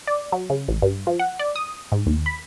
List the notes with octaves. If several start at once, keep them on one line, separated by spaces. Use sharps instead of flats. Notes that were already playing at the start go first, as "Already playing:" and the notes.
D5
F#3
C#3
A1
G2
F3
F#5
D5
D#6
G#2
D#2
B5